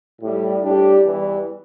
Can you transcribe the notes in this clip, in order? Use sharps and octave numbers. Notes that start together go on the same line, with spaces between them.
A2 G3
A2 G3 D4 G4
E2 E3 G3